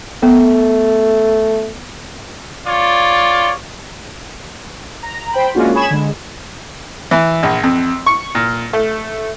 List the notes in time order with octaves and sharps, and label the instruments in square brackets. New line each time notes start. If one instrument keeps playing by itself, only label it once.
[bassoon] A3 [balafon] B3
[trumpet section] F4 C#5 D5
[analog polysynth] A#5
C5 G5 B5
G#3 A#3 C#4 D4 F4 F#4
G#4 C#5 G#5 B5 G#6 E7
D3 G#3
[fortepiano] E3
A#1
F2
C#6
A#2
A3